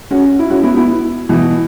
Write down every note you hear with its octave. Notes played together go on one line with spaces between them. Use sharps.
C#4 F#4
E4
C#4 F#4
B3 E4
B3 E4
B2 E3